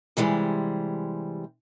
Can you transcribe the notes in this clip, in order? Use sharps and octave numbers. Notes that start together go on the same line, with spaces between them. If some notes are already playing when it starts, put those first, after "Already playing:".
C3 E3 G3 G#3